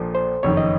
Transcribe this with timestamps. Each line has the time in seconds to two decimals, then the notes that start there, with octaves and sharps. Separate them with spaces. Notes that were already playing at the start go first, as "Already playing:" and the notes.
Already playing: A#1 A#2 F3 A4
0.15 C5
0.43 F#1 F2 D#3 C#5
0.57 D#5